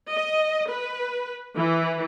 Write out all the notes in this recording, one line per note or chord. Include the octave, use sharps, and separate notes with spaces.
D#5
B4
E3